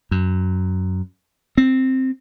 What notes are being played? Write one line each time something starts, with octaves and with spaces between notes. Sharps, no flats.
F#2
C4